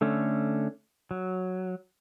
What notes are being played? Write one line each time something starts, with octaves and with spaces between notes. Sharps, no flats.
D3 A3 C#4
F#3